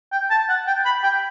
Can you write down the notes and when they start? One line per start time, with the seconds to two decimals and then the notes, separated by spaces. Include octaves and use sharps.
0.12 G5
0.30 A5
0.49 F#5
0.67 G5
0.85 B5
1.03 G5